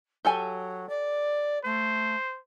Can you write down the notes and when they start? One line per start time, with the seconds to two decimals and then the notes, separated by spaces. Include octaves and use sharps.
0.25 F#3 G4 A4 G#5
0.89 D5
1.64 A3 C5